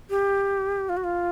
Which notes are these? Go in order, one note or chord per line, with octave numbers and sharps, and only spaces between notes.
G4
F4
F#4
F4